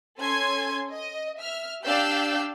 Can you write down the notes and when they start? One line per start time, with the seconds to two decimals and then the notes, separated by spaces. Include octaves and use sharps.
0.19 C#4 A4 G#5 C6 G#6
0.93 D#5
1.38 E5 F6
1.84 D4 G4 D5 F5 E6 G6